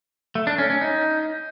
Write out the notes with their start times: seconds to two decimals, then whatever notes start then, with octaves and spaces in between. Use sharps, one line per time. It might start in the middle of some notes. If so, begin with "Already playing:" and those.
0.35 A3
0.47 D4
0.58 C#4
0.70 C#4
0.81 D#4